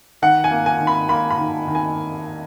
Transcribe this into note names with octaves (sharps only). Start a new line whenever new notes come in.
D#3 F#5
G#5
A#3
G#5
D#3
B5
A#3 B5
B5
D#3
D#3
G#5